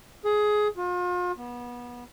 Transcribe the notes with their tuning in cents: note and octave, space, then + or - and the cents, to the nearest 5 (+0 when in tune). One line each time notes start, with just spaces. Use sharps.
G#4 +15
F4 +40
B3 -25